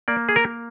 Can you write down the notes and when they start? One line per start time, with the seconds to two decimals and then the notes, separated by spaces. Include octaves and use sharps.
0.08 A#3 D5
0.29 G#4
0.36 A#4